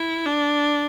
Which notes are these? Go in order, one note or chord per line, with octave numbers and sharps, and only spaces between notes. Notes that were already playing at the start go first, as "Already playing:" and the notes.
Already playing: E4
D4